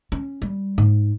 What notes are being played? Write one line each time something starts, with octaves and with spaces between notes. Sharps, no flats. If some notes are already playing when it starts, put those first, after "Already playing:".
C#4
G3
G#2